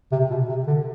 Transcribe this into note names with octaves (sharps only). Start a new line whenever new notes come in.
C3
B2
C3
D3